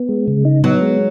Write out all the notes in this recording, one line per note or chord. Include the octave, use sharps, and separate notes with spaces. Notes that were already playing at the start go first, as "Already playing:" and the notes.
Already playing: B3
G#3
C#3
D#4
F#3 B3
G#3